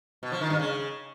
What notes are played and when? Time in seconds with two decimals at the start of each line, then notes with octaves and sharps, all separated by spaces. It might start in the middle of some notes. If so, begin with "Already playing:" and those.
0.23 B2
0.32 F3
0.41 D#3
0.50 G2
0.59 C#3